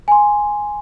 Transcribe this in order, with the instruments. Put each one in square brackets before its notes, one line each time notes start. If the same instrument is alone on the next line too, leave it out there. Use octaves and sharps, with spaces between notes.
[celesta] G#5 C6